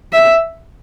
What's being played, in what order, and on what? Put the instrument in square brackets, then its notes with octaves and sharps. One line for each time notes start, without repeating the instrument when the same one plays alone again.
[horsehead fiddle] E5